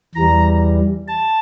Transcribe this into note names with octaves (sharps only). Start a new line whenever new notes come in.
E2 E3 G3 A#5
A5